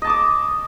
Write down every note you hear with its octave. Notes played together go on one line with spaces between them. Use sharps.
D#5 A5 D6 D#6